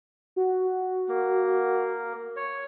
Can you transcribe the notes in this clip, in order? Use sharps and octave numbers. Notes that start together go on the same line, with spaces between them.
F#4
A#3
C#5